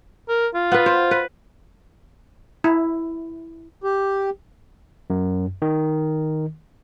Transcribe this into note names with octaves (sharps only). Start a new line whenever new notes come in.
A#4
F4
B3 B4
C5
B4
E4
G4
F#2
D#3